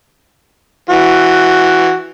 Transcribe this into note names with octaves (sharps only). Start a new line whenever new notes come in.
E3 F#4